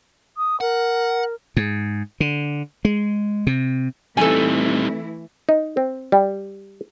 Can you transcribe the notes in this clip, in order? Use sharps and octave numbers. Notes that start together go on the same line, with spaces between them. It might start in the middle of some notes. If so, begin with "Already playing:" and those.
D#6
A#4 F#5
G#2
D3
G#3
C3
E3 G3 A3 C4 D#4 E4 A4 G#5
D#4
C4
G3